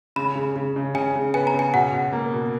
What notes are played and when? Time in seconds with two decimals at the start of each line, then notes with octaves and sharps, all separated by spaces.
0.16 C#3 B5
0.35 C#3
0.56 C#3
0.76 C#3
0.95 C#3 G#5
1.15 C#3
1.34 B3 G#5
1.47 A#5
1.54 C#3
1.59 G#5
1.74 B2 F#5
1.93 B2
2.13 A#3
2.33 B2